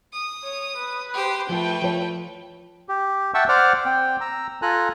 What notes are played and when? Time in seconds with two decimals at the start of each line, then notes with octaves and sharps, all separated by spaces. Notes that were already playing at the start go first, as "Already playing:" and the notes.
0.13 D#6
0.45 C#5
0.77 B4
1.14 G4 C5
1.49 F3 A3 B4 G5
1.82 F3 C#5
2.89 G4
3.34 E5 F#5 G5 A5 C#6 E6
3.49 C5 D5 F#5 D6 F6
3.85 C4 G5
4.21 A#5 E6
4.62 F4 A4 G#5 A#5 F#6